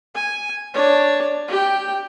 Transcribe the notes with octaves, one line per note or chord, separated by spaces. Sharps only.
G#5
D4 C#5
G4 G5